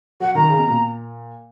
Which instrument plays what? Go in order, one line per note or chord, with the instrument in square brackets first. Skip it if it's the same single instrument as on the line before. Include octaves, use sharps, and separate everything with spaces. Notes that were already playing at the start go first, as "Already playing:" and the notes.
[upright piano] F#3 [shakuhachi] F#5
[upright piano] D#3 [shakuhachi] A#5
[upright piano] C#3
B2
A#2